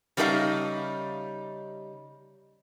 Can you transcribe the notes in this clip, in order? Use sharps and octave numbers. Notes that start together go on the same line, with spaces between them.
C#3 G3 D#4 A4 E5 F5